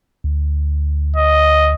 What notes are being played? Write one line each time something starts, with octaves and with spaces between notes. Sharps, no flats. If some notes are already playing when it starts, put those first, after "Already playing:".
D2
D#5